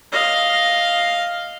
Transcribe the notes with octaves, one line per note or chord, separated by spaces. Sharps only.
D#5 F5